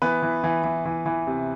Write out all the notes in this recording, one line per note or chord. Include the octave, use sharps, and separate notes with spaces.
E3 B3 B4
E3
E3
E3
E3
E3
C3